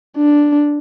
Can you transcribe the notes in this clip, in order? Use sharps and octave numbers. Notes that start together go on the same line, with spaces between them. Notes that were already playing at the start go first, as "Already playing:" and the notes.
D4